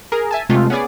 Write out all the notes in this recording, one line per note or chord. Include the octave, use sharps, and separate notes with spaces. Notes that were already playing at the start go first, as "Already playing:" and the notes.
G#4 A#4
E5 G#5 A5
C3 G#3 A3 F4
B3 C#4 G#4 D5